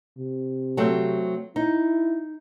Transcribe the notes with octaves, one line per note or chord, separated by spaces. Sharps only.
C3
F#3 A3 C4
D#4 E4